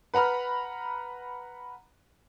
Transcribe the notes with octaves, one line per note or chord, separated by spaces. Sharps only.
B4 F#5 A#5 B5 F6